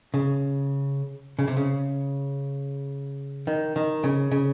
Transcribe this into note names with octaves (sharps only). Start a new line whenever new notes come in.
C#3
C#3
C3
C#3
D#3
D#3
C#3
C#3